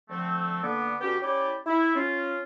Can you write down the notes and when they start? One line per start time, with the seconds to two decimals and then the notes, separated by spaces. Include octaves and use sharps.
0.10 D3 F3 A3 C4
0.63 D3 A#3 B3 D6
1.01 D3 B3 C#4 F#4 G4
1.22 C#4 E4 G4 D5
1.66 E4
1.95 C#4 F4